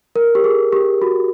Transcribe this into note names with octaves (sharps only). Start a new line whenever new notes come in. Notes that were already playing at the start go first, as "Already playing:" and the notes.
A#4
G4
G#4
G4
F#4